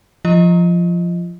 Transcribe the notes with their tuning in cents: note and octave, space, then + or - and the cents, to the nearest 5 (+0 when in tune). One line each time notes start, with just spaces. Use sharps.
F3 +0 F4 -40 D#5 +5